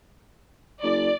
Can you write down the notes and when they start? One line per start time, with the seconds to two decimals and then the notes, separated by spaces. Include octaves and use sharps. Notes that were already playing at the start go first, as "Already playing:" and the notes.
0.83 F#1 D5